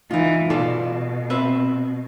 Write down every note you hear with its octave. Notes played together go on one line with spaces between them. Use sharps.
E3 D#4 F4
B2 F4 A4 D5
C4 B4 E5